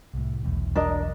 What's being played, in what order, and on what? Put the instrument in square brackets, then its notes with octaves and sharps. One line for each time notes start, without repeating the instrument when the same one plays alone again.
[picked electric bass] C2 A2
E1 B1 E2
[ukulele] D4 A#4 D#5